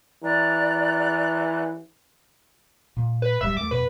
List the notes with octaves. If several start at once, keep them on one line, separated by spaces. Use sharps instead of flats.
E3 D5 A#5 F#6
A#2
B4
D1 F#2 G3 E5
D#2 A3 D6
F2 B2 B4